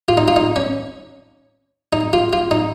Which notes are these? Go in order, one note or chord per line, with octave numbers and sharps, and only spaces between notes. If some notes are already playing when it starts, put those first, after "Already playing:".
F4
D#4
F4
D#4
C#4
D#4
F4
F4
D#4